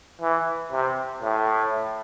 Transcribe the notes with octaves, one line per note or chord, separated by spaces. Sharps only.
E3
C3
A2